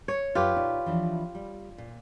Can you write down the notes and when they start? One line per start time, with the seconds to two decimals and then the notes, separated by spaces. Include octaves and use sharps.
0.08 C#5
0.35 F#2 F4 G4 B4
0.56 A#2 D#4 D5
0.86 E3 F3 D4
1.35 G3
1.78 A#2